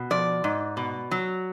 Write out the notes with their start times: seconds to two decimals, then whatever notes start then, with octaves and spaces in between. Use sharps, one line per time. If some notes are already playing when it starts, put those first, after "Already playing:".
Already playing: B2
0.11 F3 D5
0.44 G#2
0.77 B2
1.11 F#3